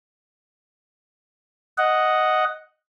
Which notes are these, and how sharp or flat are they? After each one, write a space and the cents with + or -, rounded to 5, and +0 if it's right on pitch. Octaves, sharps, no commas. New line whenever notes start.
D#5 +0 F#5 +0